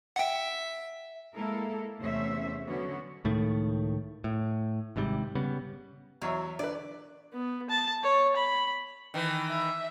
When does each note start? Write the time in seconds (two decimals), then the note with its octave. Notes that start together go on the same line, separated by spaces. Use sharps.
0.16 E5 F#5 G5
1.34 G#3 A#3 E4 A4 A#4
1.99 E2 C3 A3 C#4 C5 E5
2.66 D3 F#3 B3 C#4 F#4
3.24 C#2 A2 D#3 A3
4.24 A2
4.96 G#1 G#2 C3 G3
5.35 C#3 G3 B3
6.22 E2 F#3 C#5 E5
6.59 D3 B4 D5
7.32 B3
7.70 A5
8.03 C#5
8.36 B5
9.14 D#3 E3
9.50 E5